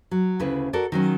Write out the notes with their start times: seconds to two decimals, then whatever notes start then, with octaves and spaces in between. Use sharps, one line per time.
0.11 F#3
0.40 D2 C#3 E4 B4
0.73 F#4 A4 A#4 D5
0.92 D#3 F#3 C#4